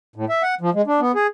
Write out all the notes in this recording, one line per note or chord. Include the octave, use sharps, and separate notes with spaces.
A2
E5
F#5
F3
G#3
D4
B3
G#4